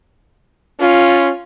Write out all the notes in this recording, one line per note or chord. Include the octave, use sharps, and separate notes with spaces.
C#4 F4